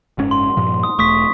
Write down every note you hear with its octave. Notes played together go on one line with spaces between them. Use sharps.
F#1 G#2 C#4
C6
G2 A#2 F3
D#6
E1 A3 C#6 D#6 B6